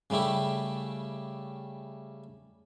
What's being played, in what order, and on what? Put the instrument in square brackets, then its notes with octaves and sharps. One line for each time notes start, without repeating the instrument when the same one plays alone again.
[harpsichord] C#3 G3 A3 E4 G4